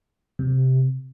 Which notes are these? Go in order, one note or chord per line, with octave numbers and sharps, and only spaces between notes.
C3